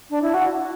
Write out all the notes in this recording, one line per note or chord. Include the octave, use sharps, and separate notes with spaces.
D4
E4
F#4